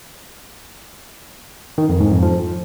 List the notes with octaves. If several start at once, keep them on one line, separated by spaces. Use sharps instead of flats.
D#3
F2
G#2
F2
F3